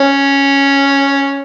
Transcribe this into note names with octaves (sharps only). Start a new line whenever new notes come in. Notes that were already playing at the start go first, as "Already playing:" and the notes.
Already playing: C#4